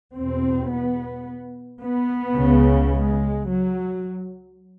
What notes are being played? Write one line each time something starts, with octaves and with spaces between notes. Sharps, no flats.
E2 B2 C4
B3
B3
C#2 C#3
G#3
F#3